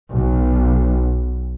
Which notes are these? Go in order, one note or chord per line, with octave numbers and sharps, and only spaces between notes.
B1